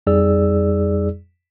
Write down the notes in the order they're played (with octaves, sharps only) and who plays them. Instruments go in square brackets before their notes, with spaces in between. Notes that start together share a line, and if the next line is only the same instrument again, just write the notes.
[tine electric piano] F2 G3 D#4 G#4 D5 E6